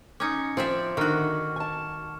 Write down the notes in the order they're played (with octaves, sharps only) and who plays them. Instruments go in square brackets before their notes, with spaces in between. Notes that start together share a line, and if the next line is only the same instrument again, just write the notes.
[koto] C#4 D#4 [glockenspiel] D6 G#6 C#7
[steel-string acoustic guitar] F3 [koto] C4 D5 E5
[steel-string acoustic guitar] D3 [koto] D#3 F#4 [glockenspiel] C#6 F6
[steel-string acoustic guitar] G#5 A5